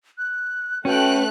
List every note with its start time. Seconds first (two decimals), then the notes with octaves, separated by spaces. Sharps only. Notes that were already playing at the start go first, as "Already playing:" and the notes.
0.18 F#6
0.85 A3 C#4 F#4 B4 G5 F#6